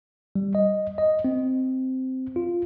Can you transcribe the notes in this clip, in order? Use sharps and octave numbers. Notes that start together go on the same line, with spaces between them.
G3
D#5
D#5
C4
F4